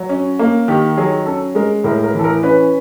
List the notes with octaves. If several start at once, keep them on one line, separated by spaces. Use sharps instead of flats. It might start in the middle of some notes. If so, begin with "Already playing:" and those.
Already playing: F#3
C#4
A#3
D#3 G4
F#3 G#4
C#4 A4
G#3 A#4
A2 A#4
A#4
E3 A4
A#4
C#4 B4